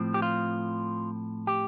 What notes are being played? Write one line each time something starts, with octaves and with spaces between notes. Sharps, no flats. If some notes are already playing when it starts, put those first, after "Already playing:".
Already playing: A2 F3 C4
G4
F4
G4